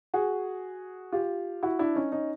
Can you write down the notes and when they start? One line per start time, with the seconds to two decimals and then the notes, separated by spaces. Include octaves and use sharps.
0.14 F#4 G#4
1.12 F4 G4
1.63 E4 F#4
1.79 D4 E4
1.95 C#4 D#4
2.12 C#4 D#4